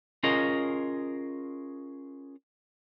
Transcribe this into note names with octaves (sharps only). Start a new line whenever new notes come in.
C#4 F4 G#4 A#4 D#5